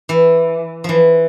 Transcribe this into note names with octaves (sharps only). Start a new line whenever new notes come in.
E3
E3 F3